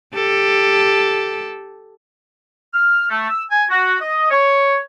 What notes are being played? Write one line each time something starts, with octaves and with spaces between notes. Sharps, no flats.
G4 A4
F6
A3
E6
G#5
F#4
D#5
C#5